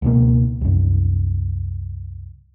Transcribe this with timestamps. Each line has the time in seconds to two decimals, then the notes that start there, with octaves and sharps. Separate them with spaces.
0.02 C#2 B2 A#3
0.61 C2 F#2